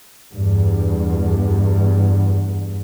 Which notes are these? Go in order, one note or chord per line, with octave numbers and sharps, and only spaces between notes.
E2 G2